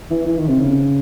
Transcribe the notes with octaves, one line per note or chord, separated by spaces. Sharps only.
E3
E3
D#3
C3
C#3